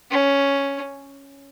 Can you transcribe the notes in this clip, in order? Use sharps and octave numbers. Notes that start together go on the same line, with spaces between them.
C#4